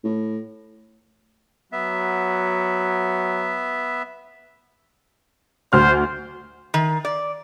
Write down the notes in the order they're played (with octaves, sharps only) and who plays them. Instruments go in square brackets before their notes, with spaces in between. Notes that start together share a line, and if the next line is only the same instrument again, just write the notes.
[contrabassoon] A2
[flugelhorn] F#3 [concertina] B3 E5
[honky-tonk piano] D2 F6 [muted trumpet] C5
[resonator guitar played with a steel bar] D#3
D5